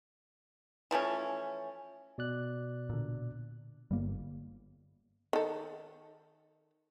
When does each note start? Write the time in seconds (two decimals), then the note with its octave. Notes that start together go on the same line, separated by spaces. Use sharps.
0.91 E3 F3 A3 C#4
2.18 B2 D5 F#6
2.90 A#2 D3
3.91 G1 G3 A#3
5.33 D#3 A4